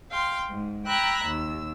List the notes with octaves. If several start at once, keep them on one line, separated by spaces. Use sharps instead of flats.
F5 G5 C6
G#2
G5 A#5 B5 E6 F#6 G#6
D#2 E6